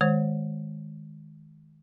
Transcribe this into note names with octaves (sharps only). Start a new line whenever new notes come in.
D#3 G#3 C5